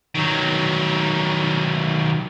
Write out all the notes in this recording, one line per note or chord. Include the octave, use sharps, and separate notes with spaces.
D#3 F#3